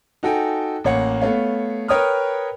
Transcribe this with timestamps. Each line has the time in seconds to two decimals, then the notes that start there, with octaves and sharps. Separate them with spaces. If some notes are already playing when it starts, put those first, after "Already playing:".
0.23 D#4 F#4 A4 G5 G#5
0.84 A1 A#3 C#5 F#5 C#7
1.21 A3 B3 C#5 F5
1.88 A#4 B4 C#5 G5 D#6 F6